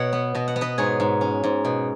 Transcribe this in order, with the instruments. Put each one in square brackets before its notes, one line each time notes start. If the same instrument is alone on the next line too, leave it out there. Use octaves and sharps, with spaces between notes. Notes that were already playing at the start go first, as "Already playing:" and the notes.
Already playing: [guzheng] B2 C#5 F#5
B3
B2 D#5
F#5
B3
B4 D#5
G#2 G#4 C#5
G#2
C#4
G#2
B2